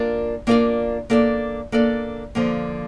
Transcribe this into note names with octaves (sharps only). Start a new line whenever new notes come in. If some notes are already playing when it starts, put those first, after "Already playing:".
Already playing: A#3 D4 F4 A#4 D5
A#3 D4 F4 A#4 D5
A#3 D4 A4 D5
A#3 D4 A4 D5
D3 F3 A#3